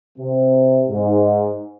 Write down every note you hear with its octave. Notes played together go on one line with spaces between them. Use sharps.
C3
G#2